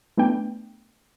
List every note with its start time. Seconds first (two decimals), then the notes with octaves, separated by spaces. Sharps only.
0.17 A3 B3 D4 G5